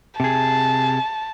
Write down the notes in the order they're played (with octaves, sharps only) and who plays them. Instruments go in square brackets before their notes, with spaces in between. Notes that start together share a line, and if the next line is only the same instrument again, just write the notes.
[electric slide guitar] C3 G#4 [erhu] A5